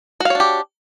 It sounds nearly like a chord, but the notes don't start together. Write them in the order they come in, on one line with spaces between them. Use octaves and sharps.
F#4 F5 C#5 D4 G4